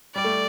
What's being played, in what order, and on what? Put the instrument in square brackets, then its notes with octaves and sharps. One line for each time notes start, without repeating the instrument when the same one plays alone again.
[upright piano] G3 [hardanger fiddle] D5
[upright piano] A3